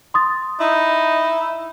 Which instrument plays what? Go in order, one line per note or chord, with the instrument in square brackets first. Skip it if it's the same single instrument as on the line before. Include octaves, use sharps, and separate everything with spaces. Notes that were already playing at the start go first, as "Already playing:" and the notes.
[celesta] C6 D#6 A6
[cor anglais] D#4 [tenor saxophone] E4